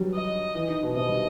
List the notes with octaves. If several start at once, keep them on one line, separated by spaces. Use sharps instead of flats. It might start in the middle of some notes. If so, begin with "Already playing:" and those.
Already playing: F#3 G3
D#5
E3
D#3
B2
C3 D#5
G3